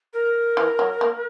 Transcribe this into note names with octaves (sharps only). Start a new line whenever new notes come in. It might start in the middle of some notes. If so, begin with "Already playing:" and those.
A#4
E3
F#3
A#3